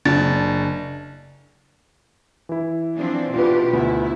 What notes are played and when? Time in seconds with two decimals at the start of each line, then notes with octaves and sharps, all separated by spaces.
0.05 F#1 D4 A6
2.49 E3 E4
2.98 F3 C4 D4
3.34 B2 D4 F4 G4 B4
3.73 D2 B3 E4